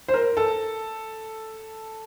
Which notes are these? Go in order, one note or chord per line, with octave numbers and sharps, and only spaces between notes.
C5
A#4
A4